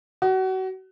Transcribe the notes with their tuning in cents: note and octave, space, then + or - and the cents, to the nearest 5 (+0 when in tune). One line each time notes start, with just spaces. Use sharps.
F#4 +30